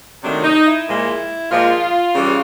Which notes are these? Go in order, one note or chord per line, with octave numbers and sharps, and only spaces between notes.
C3 D#3 F#3 A3 D4
D#4
E4
A#2 F3 G#3
A#2 F3 G#3 F4
C#3 E3 G3